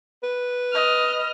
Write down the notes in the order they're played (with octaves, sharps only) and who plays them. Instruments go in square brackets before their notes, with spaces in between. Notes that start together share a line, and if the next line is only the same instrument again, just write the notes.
[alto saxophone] B4
[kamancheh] D#5 F6